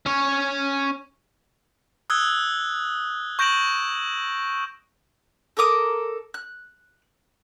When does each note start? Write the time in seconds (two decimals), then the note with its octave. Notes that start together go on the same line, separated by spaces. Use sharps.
0.06 C#4 C#5
2.10 D#6 E6 F#6 G#6 G7
3.39 C#6 G6 A#6 D7 E7 F#7
5.57 A4 A#4 D6 D#6
6.34 F#6